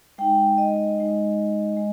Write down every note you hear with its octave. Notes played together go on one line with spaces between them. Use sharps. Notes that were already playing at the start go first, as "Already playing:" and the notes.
G#3 D#4 G5
D#5
G#3 D#4
G#3